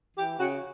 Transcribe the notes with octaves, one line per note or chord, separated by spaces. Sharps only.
E3 G4
C#3 F#4